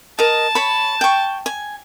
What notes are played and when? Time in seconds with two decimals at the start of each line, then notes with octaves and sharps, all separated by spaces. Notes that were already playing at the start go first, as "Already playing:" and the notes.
0.19 A#4 D#5 A5
0.55 C#5 B5
1.01 G5 C#6
1.46 G#5